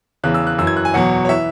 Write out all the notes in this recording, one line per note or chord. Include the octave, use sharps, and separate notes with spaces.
E2 C#3 E3 F#6
E6
F#6
F#2 E3 E6
G#6
F#6
G#5
E2 B2 F#3 F#5
C#5
E3 E5